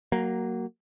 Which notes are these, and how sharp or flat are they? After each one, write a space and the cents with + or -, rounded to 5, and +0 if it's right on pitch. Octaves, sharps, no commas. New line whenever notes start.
F#3 +15 A#3 -5